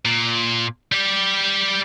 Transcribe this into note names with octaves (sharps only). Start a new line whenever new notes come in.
A#2
G3 G4